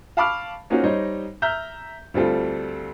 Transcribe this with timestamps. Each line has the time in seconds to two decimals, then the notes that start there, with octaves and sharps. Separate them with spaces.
0.17 F5 A5 B5 C#6 D6 F6
0.70 A#3 C#4 D#4 F4 F#4 C5
0.83 G3 D#4 C5 C#5 D#5
1.42 E5 A#5 F6 G6
2.14 D2 G3 C4 F4 A4